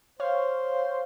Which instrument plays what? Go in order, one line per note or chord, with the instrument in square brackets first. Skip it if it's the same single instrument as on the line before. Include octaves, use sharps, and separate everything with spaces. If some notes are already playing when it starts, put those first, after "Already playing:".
[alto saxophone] C5 [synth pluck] C#5 F5